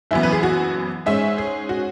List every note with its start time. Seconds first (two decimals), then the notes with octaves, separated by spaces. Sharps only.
0.11 F#1 F#2 E3 B3 E4
0.23 B4
0.32 G#4
0.43 F#4
1.06 G#2 G#3 C#4 E5
1.38 G#4
1.69 F#4